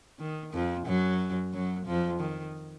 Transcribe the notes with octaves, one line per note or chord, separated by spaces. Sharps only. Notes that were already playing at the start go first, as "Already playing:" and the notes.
D#3
F2 F3
F#2 F#3
F#2 F#3
F2 F3
D#3